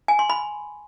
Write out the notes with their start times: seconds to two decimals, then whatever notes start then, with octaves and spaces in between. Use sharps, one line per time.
0.08 G#5
0.19 C6
0.30 B5